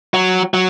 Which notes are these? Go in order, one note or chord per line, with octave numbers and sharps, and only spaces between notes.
F#3
F#3